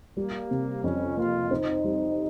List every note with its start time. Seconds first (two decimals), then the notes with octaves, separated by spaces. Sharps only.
0.17 G3 A#3
0.51 C3
0.84 F2 C#4
1.17 A#3 F4
1.51 C4 D#4
1.84 G3